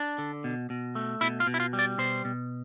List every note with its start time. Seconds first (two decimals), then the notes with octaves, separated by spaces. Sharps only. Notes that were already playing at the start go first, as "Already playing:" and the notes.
Already playing: D4
0.18 D3
0.44 B2
0.70 B2
0.95 A3
1.21 B2 E4
1.40 F4
1.47 B2
1.54 E4
1.60 F4
1.73 G3
1.79 D5
1.98 B2 C5
2.25 B2